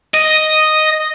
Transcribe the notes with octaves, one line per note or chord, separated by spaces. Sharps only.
D#5